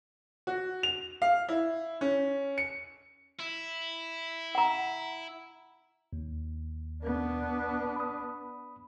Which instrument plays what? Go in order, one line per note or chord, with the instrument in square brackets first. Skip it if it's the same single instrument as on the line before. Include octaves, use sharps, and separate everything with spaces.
[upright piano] F#4
F7
F5
E4
C#4
C#7
[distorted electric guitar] E4
[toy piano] F#5 A#5
[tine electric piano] D#2
[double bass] B3 D4
[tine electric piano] B5 D#6